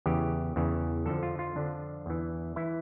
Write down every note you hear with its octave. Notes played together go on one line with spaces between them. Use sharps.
E2 C#3 E3 G4
E2 C#3 E3
F2 D3 F3 A4
F4
F4
F2 D3 F3 D4
E2 E3
E3 E4